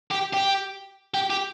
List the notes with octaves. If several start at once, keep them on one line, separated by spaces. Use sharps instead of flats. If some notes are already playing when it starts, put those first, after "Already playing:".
G4
G4
G4
G4